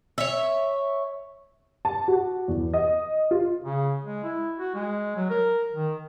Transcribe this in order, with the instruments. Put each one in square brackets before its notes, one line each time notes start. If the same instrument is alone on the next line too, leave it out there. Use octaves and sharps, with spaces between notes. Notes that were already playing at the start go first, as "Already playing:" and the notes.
[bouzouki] C#5 E5
[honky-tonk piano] A5
F#4
E2
D#5
F4
[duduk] C#3
G#3
E4
F#4
G#3
F#3
A#4
D#3